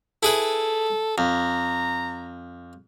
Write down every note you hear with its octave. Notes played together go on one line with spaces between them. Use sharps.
E4 G#4 A4 B4
F2 A#5